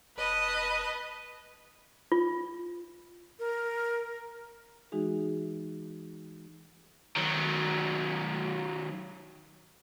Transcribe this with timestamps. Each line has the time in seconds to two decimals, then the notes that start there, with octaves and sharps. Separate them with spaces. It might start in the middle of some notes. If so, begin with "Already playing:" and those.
0.17 F1 B4 D#5 A5
2.12 F4
3.39 A#4
4.92 E3 G#3 D#4 F#4 G#4
7.16 D#3 F#3